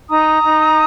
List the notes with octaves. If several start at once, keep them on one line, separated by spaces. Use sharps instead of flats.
D#4 A#5 D#6
D#4